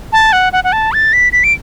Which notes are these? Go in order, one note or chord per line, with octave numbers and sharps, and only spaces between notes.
A5
F#5
F#5
F#5
A5
A6
B6
B6
D7